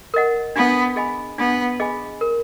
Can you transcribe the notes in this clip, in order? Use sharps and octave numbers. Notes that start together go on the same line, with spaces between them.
A#4 D#5 F#5
B3 D4
G#4 D#5 G#5 B5
B3 D4
G#4 D#5 G#5 B5
A#4